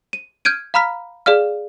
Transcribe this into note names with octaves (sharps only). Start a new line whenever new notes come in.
D#7
F6 G6 G#6 D7 D#7
F5 A#5 B5 F6 B6
G#4 D5 F5 F6